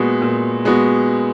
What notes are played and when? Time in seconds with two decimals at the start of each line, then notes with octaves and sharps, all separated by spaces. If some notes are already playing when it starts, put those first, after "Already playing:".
Already playing: A#2 G#3 B3 F#4
0.22 A#2
0.65 G#3 B3 F#4